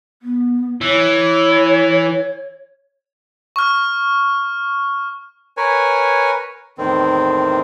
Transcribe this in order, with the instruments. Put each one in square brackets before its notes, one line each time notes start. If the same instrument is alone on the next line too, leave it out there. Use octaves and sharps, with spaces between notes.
[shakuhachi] B3
[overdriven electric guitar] E3 [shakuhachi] C#5
[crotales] C#6 F6
[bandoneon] A#4 B4 C#5 G#5
E2 A2 D#3 C4